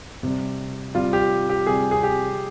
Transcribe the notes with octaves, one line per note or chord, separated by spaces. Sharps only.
C3 G3
C3 G3 F4
G4
G4
C3 G3 G#4
G#4
G4